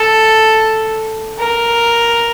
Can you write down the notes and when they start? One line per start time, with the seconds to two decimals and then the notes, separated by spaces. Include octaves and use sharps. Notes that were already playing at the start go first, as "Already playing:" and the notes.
Already playing: A4
1.39 A#4